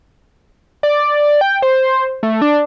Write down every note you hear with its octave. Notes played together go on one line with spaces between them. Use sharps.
D5
G5
C5
A3
D4